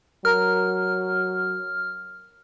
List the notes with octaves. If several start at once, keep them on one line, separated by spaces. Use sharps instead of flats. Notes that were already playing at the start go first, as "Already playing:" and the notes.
F#3 A#4 A#5 F6